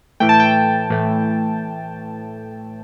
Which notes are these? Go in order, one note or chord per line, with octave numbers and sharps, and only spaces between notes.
A2 E3 A3 G5
A5
G5
A2 E3 A3